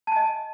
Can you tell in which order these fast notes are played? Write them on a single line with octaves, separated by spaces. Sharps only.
A5 G#5 D#5